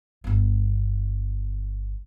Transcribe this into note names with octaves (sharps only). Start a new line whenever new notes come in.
G1 B3